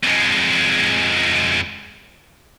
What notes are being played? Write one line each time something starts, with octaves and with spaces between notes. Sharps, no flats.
F2 G#3